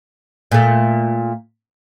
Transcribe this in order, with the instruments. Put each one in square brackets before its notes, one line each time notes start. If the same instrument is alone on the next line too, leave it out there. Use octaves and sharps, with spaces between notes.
[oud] A#2 A3